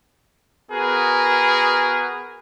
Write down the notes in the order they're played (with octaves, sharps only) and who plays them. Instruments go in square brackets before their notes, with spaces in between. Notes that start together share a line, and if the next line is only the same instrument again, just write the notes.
[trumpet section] B3 F#4 G#4 A#4